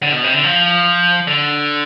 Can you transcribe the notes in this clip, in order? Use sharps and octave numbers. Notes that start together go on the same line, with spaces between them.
D3
B2
C3
D3
F3
D3